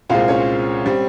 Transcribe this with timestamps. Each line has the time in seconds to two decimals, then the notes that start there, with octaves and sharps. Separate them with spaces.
0.09 C2 A#2 G#3 C4 F4 F5
0.28 C#4 C#5
0.86 G3 C4